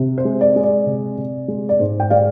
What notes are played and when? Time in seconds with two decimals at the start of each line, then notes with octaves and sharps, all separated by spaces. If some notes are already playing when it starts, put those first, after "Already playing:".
Already playing: C3
0.18 C5
0.25 G#3
0.41 D5
0.56 G#3
0.64 D5
0.86 C3
1.18 C3
1.48 G#3
1.69 D5
1.79 G#2 C5
2.00 G5
2.10 G#3 D5 F5